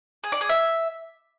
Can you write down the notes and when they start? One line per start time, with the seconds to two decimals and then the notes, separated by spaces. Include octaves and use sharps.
0.24 G#4
0.32 D5
0.41 G#4
0.49 E5